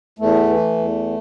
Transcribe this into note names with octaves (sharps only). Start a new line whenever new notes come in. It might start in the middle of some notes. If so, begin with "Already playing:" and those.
E2 A3
E3
E2